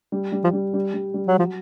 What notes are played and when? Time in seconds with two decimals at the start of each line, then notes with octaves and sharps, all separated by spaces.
0.12 G3
0.32 G3
0.44 F3
0.53 G3
0.74 G3
0.94 G3
1.14 G3
1.27 F#3
1.39 F3 F#3